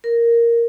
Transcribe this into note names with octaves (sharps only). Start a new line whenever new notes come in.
A#4